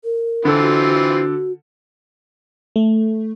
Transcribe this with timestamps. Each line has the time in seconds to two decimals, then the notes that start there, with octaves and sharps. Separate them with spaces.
0.04 A#4
0.45 D3 E3 C4 F4 A4
0.60 F#4
2.76 A3